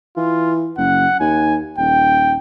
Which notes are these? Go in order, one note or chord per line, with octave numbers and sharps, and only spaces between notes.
E3 F4
F#1 F#5
D#2 G#5
D#1 G5